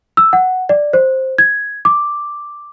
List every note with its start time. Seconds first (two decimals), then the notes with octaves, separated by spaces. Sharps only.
0.17 E6
0.33 F#5
0.69 D5
0.93 C5
1.38 G#6
1.85 D6